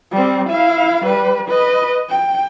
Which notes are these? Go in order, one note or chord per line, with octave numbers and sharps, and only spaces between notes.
G3 C4
E4 F5
G3 B4
B4 D#5
G5